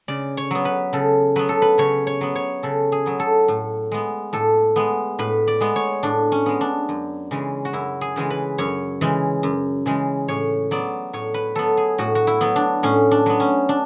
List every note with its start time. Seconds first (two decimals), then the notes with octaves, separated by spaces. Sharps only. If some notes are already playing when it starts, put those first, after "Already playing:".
0.08 C#3 D5
0.37 C#5
0.51 F#3 B3
0.65 B4
0.93 C#3 A4
1.36 F#3 B3 B4
1.49 A4
1.62 B4
1.78 C#3 C#5
2.07 C#5
2.21 F#3 B3
2.35 C#5
2.63 C#3 A4
2.92 G#4
3.06 F#3 B3
3.20 A4
3.48 A2
3.92 G#3 B3
4.33 A2 A4
4.76 G#3 B3
5.19 A2 B4
5.47 D5
5.61 G#3 B3
5.76 C#5
6.03 A2 D4
6.32 C#4
6.46 G#3 B3
6.61 D4
6.89 F#2
7.31 C#3 E3 G#3
7.65 F#4
7.73 F#2 E4
8.01 G#4
8.16 C#3 E3 G#3
8.30 B4
8.58 F#2 C#5
9.01 C#3 E3 G#3
9.43 F#2
9.86 C#3 E3 G#3
10.28 A2 C#5
10.71 F#3 B3 D5
11.13 A2 C#5
11.34 B4
11.56 F#3 B3 A4
11.77 G#4
11.98 A2 F#4
12.15 F#4
12.27 E4
12.41 F#3 B3
12.56 D4
12.83 A2 C#4
13.11 D4
13.26 F#3 B3
13.40 C#4
13.69 D4